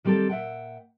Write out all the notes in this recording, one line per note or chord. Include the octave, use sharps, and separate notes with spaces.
D#3 G3 C4 G4 A4
A#2 E5 F#5 G5